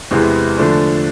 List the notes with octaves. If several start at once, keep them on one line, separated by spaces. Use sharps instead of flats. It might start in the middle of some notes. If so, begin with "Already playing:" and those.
E2 C3 E3 G#3 B3
D3 F3 A3 D4